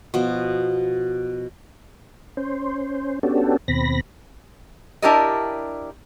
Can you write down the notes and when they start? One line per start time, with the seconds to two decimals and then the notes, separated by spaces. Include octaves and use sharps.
0.14 B2 F3
2.37 C#4 C5
3.23 B3 C#4 D4 F#4 G4 A4
3.68 D#2 B2 C4 B5 A#6
5.02 D4 E4 G4 A#4 D5 D#5